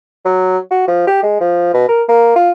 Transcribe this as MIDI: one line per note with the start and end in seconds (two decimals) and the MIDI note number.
0.25 0.58 54
0.71 0.84 66
0.88 1.07 53
1.07 1.20 67
1.23 1.36 56
1.41 1.69 53
1.74 1.87 47
1.88 2.03 70
2.08 2.32 58
2.36 2.51 65